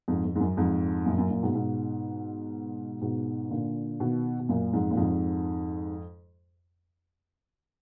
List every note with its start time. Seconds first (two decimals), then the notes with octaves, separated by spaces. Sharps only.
0.08 F2 G#2
0.25 F2
0.35 G#2
0.40 F#2
0.57 F2 G#2
1.06 F#2 A#2
1.18 F#2 A#2
1.30 F#2 A#2
1.43 G#2 B2
1.55 G#2 B2
3.01 G#2 B2
3.50 A#2 D3
4.00 B2 D#3
4.40 B2
4.49 F#2 A#2
4.73 F2 G#2
4.91 A#2
4.97 F2 G#2